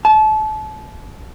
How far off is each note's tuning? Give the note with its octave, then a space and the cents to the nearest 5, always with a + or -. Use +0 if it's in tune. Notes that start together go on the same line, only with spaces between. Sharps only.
A5 -30